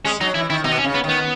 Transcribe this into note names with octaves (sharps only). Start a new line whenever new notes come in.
G#3 C#4
F#3 D#4
E3 E4
D#3 E4
B2 D#4
B3
C#4
C#3
B3
D#3
B3